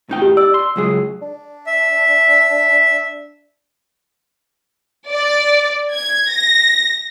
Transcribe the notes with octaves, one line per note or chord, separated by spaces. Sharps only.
A2 D#4 G5
G4
D5 E6
C6
C#2 F#3 G#4
D4
E5
D5
G#6
A#6